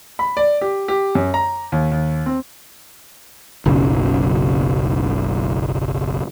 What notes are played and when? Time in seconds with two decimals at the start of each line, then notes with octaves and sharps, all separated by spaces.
0.19 B5
0.37 D5
0.61 G4
0.88 G4
1.15 F#2
1.34 A#5
1.72 D#2
1.92 D#2
2.26 C4
3.66 F#1 B1 C#3